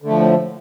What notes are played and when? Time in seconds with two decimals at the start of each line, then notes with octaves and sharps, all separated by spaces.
0.02 D3
0.06 A3
0.10 F3
0.14 A2